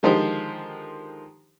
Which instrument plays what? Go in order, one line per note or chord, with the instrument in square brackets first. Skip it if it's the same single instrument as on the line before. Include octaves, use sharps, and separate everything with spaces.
[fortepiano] D3 D#3 F3 G#3 G4 C5